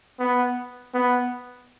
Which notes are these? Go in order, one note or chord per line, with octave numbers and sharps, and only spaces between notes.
B3
B3